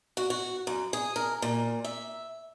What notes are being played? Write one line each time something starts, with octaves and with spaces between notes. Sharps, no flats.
F#4
F#4
F#2
G#4
A#4
A#2
E5